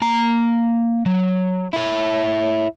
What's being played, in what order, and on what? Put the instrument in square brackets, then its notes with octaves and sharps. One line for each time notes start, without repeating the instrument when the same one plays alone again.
[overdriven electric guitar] A#3 A#5
F#3
E4 C#5